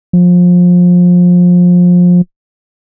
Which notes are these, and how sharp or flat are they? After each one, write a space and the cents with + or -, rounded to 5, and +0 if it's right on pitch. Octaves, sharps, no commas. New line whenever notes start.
F3 +25